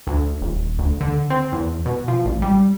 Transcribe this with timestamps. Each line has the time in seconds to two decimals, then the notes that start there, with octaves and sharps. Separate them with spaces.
0.07 D2
0.41 D#1
0.79 D2
1.01 D3
1.30 C4
1.52 E2
1.86 B2
2.08 F3
2.25 A1
2.42 G3